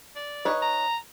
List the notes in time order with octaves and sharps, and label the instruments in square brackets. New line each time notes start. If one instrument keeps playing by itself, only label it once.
[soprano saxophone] D5
[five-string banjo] D#4 B4 C#5
[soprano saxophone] A#5